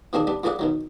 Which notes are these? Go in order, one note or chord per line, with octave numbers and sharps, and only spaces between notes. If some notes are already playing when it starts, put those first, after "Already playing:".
B2 D#3 A#3 C4 D4 G#4
G3 B3 D4
F2 E3 A#3 G#4 D5 F#5
B2 D#3 F#3